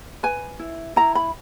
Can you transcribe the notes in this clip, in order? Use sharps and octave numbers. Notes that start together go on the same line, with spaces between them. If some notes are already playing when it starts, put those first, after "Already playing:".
B4 G#5
E4
E4 A#5
B5